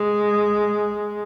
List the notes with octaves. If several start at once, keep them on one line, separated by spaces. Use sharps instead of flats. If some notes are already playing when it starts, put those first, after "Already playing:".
Already playing: G#3